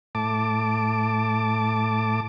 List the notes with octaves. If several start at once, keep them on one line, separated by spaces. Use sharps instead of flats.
A2 A5 D6